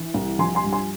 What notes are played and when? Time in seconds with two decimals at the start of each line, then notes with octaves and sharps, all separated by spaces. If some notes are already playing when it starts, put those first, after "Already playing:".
Already playing: E3
0.14 C2
0.39 F3 G#5 C6
0.55 G#5 C6
0.64 G2
0.73 G#5 C6